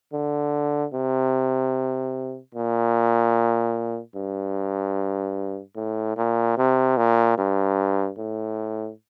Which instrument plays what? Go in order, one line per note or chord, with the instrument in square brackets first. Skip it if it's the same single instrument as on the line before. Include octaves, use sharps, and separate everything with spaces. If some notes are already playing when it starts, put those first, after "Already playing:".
[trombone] D3
C3
A#2
G2
A2
A#2
C3
A#2
G2
A2